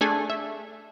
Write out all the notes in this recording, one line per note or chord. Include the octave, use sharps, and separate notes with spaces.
A3 D4 G#4 A4 G#5
E5